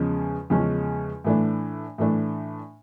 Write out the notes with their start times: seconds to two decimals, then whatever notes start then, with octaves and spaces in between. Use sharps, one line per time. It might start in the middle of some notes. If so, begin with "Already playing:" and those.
Already playing: E2 C#3 F3 G#3 C#4
0.50 E2 C#3 F3 G#3 C#4
1.24 A2 E3 A3 D4
1.98 A2 E3 A3 D4